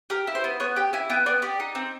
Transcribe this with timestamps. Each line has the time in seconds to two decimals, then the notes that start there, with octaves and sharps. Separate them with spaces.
0.10 G4 A#4
0.27 E4
0.35 C5
0.44 B3
0.60 B3 C#5
0.76 G4 G5
0.93 E4 G#5
1.10 B3 G5
1.26 B3 D5
1.42 G4 D5
1.60 D#4
1.75 C4